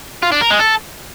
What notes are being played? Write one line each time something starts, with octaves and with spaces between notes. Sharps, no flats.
F4
D4
A#4
G#3
A4